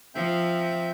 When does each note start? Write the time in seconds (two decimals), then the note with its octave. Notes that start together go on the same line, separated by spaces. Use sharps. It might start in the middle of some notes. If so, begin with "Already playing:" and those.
0.15 F3 C4 E5 G6